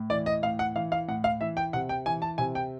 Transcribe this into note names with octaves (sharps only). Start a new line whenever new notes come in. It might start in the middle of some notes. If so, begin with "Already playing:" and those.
Already playing: A2
E3 D5
D#5
A2 F5
F#5
E3 F5
F5
A2 F#5
F5
E3 E5
G5
C3 F#5
G5
E3 G#5
A5
C3 G#5
G5